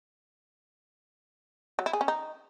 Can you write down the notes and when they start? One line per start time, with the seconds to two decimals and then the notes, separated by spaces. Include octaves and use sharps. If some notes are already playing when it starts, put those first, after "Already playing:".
1.79 F#3
1.86 E4
1.93 G#4
2.01 C#4
2.08 D#4